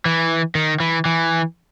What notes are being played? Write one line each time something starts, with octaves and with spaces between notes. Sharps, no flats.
E3
D#3
E3
E3